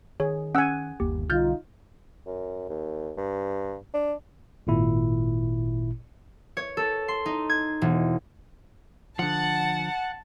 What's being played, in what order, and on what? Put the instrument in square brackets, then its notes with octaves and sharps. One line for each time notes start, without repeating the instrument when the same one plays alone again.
[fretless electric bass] D#3 [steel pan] G#4 [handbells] C#5
[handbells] C#4 E6 [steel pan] F#5 G#5
[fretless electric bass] G1 D#2 A#3 [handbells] G4
[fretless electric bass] B1 D3 G3 [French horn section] D#4 F4 [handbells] F6 G6 A6
[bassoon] F#2
D#2
G2
D4
[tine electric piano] G#1 A#2 E4
[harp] C#5
A4
C6
D#4
G#6
E1
[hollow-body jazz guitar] D3 F3 [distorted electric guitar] F#5 [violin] A5